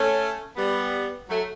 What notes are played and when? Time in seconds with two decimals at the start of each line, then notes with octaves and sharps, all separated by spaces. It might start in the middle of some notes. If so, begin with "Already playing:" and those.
Already playing: A3 C#4
0.56 G3 B3
1.29 F#3 A3